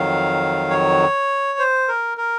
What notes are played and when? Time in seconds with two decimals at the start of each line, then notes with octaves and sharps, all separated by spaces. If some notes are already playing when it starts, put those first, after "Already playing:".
Already playing: F2 D#3 F#3 F5
0.70 C#5
1.59 C5
1.88 A#4
2.18 A#4